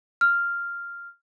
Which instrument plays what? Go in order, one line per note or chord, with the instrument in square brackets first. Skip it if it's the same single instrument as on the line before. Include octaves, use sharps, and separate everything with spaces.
[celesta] F6